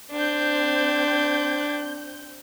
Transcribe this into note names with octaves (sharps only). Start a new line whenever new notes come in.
C4 D4 G6